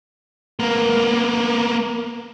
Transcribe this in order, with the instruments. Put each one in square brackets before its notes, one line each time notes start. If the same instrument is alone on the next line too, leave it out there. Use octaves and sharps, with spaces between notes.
[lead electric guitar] A#3 B3